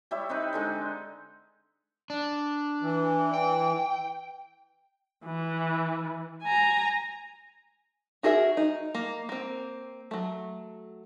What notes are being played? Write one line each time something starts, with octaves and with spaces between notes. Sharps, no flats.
G3 E4 C#5 E5
C4 D#4 B4
D3 G#3 D#4
D4
E3
G5
E3
G#5 A#5
D#4 F#4 G#4 A#4 E5
D#4
A#3
A#3 C4
F#3 A3